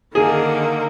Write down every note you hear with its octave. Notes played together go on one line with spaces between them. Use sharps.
D3 D#3 A#3 G#4